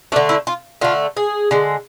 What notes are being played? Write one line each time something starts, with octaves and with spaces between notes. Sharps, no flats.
D3 A3 D4
E4
F4
D3 A3 F4
G#4
D3 G#3